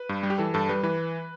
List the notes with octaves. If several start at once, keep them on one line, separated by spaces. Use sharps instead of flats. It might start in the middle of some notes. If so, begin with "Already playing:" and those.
Already playing: B4
G2
G3
G4
E3 A4
G2 A4
G3 B4
E3 B4